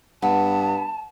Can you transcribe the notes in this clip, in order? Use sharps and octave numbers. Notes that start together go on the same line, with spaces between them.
G2 B3 A5